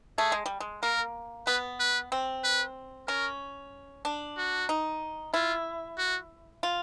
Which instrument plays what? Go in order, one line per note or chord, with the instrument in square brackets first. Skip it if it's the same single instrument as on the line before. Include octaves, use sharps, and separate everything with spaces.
[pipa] A3 [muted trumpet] G#4
[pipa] G#3
G3
G#3
[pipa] A#3 [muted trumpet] A#4
[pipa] B3 [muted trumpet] B4
[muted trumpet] B4
[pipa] C4
[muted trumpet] B4
[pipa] C#4 [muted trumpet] A#4
[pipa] D4
[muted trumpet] F#4
[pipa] D#4
[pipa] E4 [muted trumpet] F4
[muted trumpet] F#4
[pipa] F4